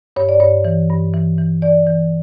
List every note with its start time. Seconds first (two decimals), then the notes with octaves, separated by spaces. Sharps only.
0.16 G2 C#5
0.29 D5
0.40 G2 C#5
0.65 E3
0.89 G2
1.14 E3
1.38 E3
1.62 E3 D5
1.87 E3